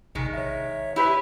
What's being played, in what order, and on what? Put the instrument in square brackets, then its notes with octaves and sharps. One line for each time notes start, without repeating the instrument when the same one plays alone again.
[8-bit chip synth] A#1 C3 [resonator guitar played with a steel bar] D#3 G#3
[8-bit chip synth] C#5 E5
[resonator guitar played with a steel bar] E4 G4 B4 [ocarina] B5